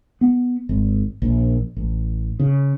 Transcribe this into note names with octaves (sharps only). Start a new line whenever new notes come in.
B3
G#1
A#1
A1
C#3